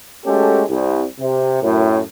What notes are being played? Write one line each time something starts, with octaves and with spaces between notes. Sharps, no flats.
G#3 A3 C#4 F#4 G4 A4
C2
C3
F#2 A2